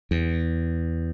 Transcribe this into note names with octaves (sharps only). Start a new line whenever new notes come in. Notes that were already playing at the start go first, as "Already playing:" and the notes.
E2